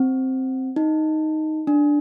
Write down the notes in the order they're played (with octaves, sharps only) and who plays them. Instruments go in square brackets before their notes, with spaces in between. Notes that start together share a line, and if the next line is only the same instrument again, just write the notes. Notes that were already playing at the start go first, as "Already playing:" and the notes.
Already playing: [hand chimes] C4
D#4
D4